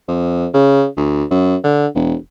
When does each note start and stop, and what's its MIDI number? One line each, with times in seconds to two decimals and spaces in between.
0.08 0.47 41
0.54 0.87 49
0.97 1.24 38
1.31 1.56 42
1.64 1.87 50
1.95 2.15 28